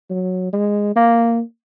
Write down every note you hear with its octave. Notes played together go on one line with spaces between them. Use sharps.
F#3
G#3
A#3